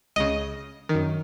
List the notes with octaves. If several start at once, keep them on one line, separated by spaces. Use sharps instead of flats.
C#2 C#3 D#5
F#2 D#3